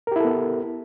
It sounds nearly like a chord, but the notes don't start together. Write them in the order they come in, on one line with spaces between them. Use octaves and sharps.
A#4 G4 E4 A4 B3